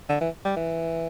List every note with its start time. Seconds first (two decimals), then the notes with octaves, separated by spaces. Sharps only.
0.09 D3
0.21 E3
0.45 G3
0.57 E3